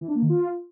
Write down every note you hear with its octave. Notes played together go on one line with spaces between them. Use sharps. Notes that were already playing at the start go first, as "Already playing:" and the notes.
E3
D4
A#3
D#3
F4